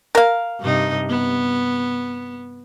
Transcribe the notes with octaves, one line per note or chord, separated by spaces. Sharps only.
A#4 F5
G2 C3 D#4
B3